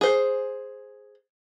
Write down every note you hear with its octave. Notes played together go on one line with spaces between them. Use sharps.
G#4 C5